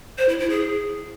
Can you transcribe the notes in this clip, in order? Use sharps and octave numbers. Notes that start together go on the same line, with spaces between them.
C5
E4
E4
G#4